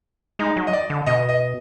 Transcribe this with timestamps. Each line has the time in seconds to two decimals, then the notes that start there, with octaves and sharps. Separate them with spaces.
0.39 G#3 D#4
0.57 F#3
0.67 D#5
0.73 D5
0.90 D3
1.06 B2 D#5
1.29 D#5